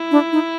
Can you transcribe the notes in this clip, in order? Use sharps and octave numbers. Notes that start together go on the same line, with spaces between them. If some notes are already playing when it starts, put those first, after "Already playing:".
Already playing: E4
D4
D#4